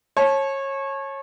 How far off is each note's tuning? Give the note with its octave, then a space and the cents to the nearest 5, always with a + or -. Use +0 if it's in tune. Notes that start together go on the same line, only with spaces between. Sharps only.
C#5 -25 A5 -30